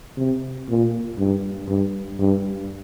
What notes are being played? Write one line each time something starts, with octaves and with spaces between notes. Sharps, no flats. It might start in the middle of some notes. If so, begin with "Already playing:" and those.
C3
A#2
G2
G2
G2